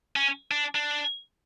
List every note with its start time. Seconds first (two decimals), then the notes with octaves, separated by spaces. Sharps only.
0.16 C#4
0.51 D4
0.75 D4